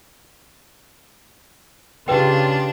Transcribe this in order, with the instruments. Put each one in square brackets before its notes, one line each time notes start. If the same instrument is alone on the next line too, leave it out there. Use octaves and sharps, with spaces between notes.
[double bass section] C#3 [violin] D4 [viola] F4 G4 [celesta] B4 G5